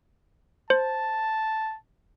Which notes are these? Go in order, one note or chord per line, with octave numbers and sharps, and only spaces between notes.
C5 A5